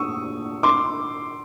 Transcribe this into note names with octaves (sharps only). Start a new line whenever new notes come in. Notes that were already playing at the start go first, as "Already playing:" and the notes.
Already playing: C#6 D#6 E6
C6 D6